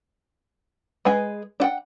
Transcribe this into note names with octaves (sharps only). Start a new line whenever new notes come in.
G#3 G#4 B4 G#5
D4 F#5 G5